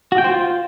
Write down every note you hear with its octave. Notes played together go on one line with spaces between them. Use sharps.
F#4
G5
C5
F4